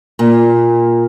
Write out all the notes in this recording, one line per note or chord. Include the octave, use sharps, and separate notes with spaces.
A#2